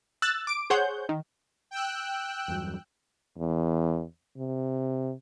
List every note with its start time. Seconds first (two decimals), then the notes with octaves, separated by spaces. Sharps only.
0.22 E6 F#6 A6
0.47 D6 D7
0.70 G#4 C5 C#5 F#5 G6
1.09 D#3
1.71 G5 E6 F#6
2.48 E2 G2 F#3
3.38 E2
4.37 C3